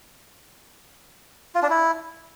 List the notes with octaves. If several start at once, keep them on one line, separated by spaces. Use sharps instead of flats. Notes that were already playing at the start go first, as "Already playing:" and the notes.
F4
D4
E4